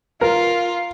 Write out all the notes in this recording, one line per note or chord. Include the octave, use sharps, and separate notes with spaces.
F4 A#4